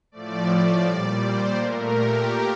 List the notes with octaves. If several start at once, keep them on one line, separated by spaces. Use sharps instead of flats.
A2 F3 A3 D5
D5
A#2 G3 D5
C5
A#2 A3 A#4
G4